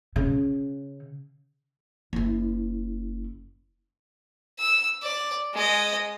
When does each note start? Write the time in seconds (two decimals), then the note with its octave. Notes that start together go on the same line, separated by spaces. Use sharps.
0.16 C#3
2.13 F#1 E4
4.59 E6
5.02 D5
5.54 G#3 D#5